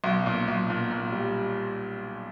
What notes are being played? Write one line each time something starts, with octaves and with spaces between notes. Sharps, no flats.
B1
A#2
B1
A#2
A#2
G3